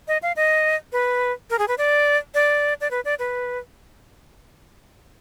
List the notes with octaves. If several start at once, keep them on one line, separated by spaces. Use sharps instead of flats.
D#5
F5
D#5
B4
A#4
G#4
B4
D5
D5
D5
B4
D5
B4